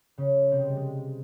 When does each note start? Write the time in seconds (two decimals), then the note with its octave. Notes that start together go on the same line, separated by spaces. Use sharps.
0.18 C#3 C#4
0.52 C3 C4
0.60 G#3
0.68 G3
0.77 G#3